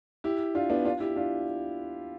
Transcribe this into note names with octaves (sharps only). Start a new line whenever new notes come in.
E4 G4
D4 F4
B3 D4
D4 F4
E4 G4
D4 F4